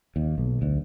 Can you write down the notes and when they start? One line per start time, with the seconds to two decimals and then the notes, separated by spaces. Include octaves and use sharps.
0.16 D#2
0.38 B1
0.62 D2